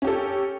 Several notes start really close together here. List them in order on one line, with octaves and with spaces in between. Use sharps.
C#4 G4 A4